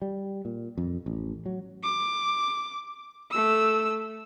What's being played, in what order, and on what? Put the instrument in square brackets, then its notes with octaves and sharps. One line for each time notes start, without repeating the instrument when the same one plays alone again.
[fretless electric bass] G3
A#2
F2
A1
F#3
[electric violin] D6
A3 E6